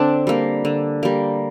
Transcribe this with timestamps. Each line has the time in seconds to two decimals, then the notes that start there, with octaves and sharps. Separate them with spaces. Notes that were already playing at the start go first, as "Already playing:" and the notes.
Already playing: D3 C4 D4
0.27 G3 A#3
0.65 D3
1.03 G3 A#3